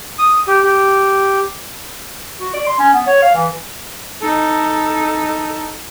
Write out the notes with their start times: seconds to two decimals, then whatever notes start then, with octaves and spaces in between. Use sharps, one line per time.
0.19 D#6
0.48 G4
0.64 G4
2.40 F#4
2.53 D5
2.67 C6
2.79 C#4
2.94 B3
3.07 C#5
3.22 F5
3.35 E3
4.21 D#4 A4